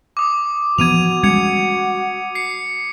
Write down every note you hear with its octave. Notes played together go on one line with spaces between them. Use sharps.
D6 D#6
E3 F3 B3 F#4 G#6 D#7 F7
G3 G#3 C#4 G#6 C#7 F7
C7 C#7